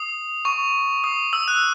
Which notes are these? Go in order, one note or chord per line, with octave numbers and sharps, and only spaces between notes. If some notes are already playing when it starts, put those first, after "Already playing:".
Already playing: D#6
C#6
D#6
E6
F#6